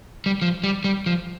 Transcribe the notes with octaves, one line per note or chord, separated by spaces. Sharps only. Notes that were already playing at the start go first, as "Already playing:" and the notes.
G3
F3
G3
G3
F3